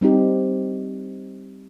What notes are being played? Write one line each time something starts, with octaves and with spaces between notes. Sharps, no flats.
G3 C4 D#4 G4